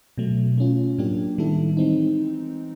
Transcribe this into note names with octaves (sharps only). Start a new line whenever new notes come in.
B2 F#3 A3
A3 C#4 F4
A2 F#3 A#3 D4 G4
D#3 G3 B3 E4 A4
E3 G#3 C4 D#4